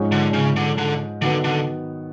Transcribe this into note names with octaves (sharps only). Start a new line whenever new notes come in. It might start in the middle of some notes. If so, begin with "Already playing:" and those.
Already playing: G#2 F3 G#3 C#4
D3
C#3
D3
D3
D3 D#3 F#3 B3
D3